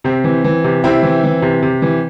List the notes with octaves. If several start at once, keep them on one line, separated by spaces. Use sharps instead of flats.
C3 C4
E3
E3
C3
C3 C4 E4
E3
E3
C3
C3
E3